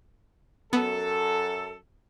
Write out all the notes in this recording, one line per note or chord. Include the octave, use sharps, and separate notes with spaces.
F#2 B3 A4